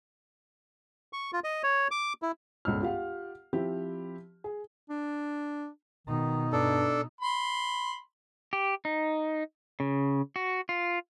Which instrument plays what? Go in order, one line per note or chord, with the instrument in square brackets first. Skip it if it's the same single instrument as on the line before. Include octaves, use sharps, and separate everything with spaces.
[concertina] C#6
F4
D#5
C#5
D6
E4
[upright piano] G1 C#2 G#2 E6 F6
F4 G4 F5 F#5
F3 C4 E4 G4
G#4
[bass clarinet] D4
[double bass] B2 D#4 [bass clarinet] D#3
[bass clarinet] G2 [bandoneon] D4 A4
[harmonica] B5 C6
[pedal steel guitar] G4
D#4
C#3
F#4
F4